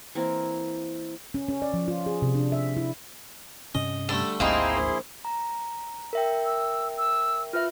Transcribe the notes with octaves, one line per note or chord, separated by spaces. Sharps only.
E3 A#3 C4
C#4
C#4
D5
F3
F4
G#4
C3
D4
E5
E4
G2 C3 C#4 D#5
D3 G3 A3 A4
G#1 D2 A#3 C4 D#4 E4 G#4 C6
A#1
A#5
A#4 E5 G5
E6
E6
F4 B4 E5 F6